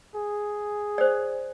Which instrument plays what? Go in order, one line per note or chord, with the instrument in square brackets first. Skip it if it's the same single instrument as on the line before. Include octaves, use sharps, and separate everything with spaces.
[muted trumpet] G#4
[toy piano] C5 D5